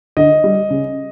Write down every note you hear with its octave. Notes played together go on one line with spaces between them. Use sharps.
D3 D#5
G3
C#3